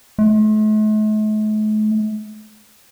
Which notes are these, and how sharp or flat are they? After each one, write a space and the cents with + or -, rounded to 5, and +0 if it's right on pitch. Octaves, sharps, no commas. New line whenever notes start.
A3 -45